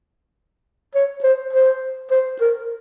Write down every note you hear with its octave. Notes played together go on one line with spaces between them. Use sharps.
C#5
C5
C5
C5
A#4